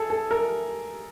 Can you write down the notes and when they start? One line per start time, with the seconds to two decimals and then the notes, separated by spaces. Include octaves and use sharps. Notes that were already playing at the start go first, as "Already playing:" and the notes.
Already playing: G#4 A4
0.10 A4
0.31 A#4